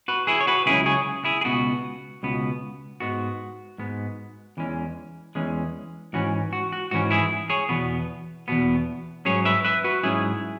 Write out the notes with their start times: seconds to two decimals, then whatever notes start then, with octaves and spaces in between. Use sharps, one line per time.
0.08 F#4 B4
0.27 E4 G#4
0.40 C#5
0.47 F#4 B4
0.66 C#2 C#3 F#3 E4 G#4
0.86 G#4 C#5
1.25 E4 G#4
1.41 G#4
1.44 C#2 B2 B3 F#4
2.23 C#2 B2 B3
3.00 G#2 G#3 B3 F#4
3.78 G#2 G#3 B3
4.57 E2 E3 G#3 C#4
5.35 E2 E3 G#3 C#4
6.13 G#2 E3 C#4 F#4
6.53 F#4
6.72 F#4
6.91 G#2 E3 C#4 F#4
7.11 E4 G#4
7.50 G#4 C#5
7.69 E2 B2 B3
8.48 E2 B2 B3
9.25 G#2 F#3 C#4 G#4 C#5
9.45 B4 E5
9.65 B4 E5
9.84 F#4 B4
10.03 G#2 F#3 C#4 E4 G#4